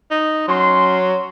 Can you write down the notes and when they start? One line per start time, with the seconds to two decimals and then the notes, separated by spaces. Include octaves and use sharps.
0.11 D#4
0.48 F#3 C#4 C6